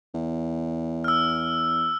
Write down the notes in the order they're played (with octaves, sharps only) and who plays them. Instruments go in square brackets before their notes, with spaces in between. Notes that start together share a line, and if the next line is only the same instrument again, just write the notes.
[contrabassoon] E2
[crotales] E6 F6